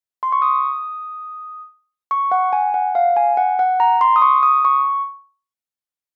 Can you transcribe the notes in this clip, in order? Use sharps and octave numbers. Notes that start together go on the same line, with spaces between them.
C6
C#6
D#6
C#6
F#5
G#5
F#5
F5
G#5
F#5
F#5
A#5
C6
D#6
C#6
D#6
C#6